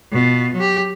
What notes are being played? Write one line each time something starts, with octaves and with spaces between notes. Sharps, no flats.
B2 F4
F#3 G4